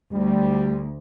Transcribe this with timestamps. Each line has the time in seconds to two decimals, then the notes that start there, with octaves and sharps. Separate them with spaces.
0.13 D2 G3